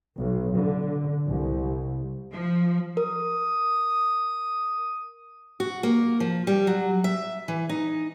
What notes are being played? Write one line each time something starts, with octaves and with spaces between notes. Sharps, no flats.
B1
D3
C2
F3
A#4 D#6
F#4
A#3
F3
G3
F#3
E5
E3
D#4